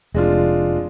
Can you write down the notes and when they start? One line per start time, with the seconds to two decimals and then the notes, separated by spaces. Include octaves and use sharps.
0.14 F1 G#3 D4 F4